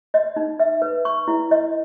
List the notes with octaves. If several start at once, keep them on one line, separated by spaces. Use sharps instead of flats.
D#5
D#4
E5
B4
C#6
E4
D#5